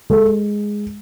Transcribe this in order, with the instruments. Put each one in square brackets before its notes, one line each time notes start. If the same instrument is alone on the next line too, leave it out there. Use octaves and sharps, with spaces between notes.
[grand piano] G#3 A4